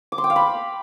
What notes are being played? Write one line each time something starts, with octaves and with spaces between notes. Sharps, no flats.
D6
C6
G5
F5
B5